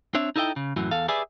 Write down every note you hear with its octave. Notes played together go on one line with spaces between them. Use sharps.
C4 D4 C#5 E5
D#4 E4 A4 D#5 E5 G5
C#3
F#2 A2 E3 F#3
E2 A4 F5
G4 G#4 B4 D5 E5 G#5